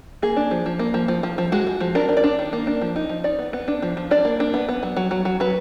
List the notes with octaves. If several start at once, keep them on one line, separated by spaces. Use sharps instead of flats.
A#3 G#4
D4
F3
F3
A#3
F3
F3
F3
F3
G#3 F#4
G#3
F3
D4 A#4
D4
D5
D4
D#3
A#3
D4
F3
D#4
F3
D#4 D5
B3
B3
D4
F3
F3
D4 D5
A#3
D4
B3
B3
F#3
F#3
F#3
F#3
F#3 B4